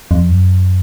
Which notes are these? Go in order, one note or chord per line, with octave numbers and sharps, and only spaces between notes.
F2
F#2